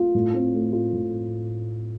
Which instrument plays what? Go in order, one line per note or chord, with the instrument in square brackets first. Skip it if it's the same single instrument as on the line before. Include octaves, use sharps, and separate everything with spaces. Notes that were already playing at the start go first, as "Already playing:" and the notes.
Already playing: [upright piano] F4
A2
C4
A3
F4
A2